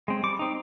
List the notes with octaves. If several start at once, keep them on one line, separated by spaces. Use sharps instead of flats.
G#3 C4
G3 D6
C4 D#4